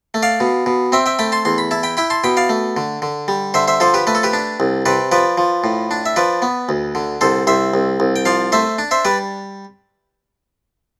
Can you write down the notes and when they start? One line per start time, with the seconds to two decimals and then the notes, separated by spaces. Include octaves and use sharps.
0.14 A3
0.23 D5 F5
0.40 B2
0.66 B2
0.92 C4 E5 G5
1.06 E5 G5
1.19 A3 G5 B5
1.32 A5 C6
1.45 E2 C6
1.58 B5
1.71 E4 A5
1.83 G5 B5
1.97 E4 G5 B5
2.10 A5 C6
2.24 B2 G5 B5
2.37 D5 F5
2.49 A3
2.77 D3
3.02 D3
3.28 G3
3.54 D3 C5 E5
3.68 C5 E5
3.80 F3 A4 C5
3.94 G4 B4
4.07 A3 B4
4.15 A4
4.23 G4 B4
4.33 D4
4.60 C2
4.86 C3 B4 D5
5.12 F3 B4 D5
5.38 F3
5.64 A2
5.91 D4
6.06 E5
6.16 F3 B4 D5
6.42 B3
6.69 D2
6.95 D3
7.21 C2 A4 C5
7.47 C2 C5 E5
7.74 C2
8.00 C2
8.16 G5
8.25 F3 D5 F5
8.52 A3 C5 E5
8.79 D4
8.91 C5 E5
9.05 G3 B4 D5